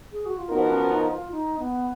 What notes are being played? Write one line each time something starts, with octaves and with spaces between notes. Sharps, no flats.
G#4
F#4
F4
F3 B3 D#4 F#4 A#4
C#4
D#4
F4
D#4
B3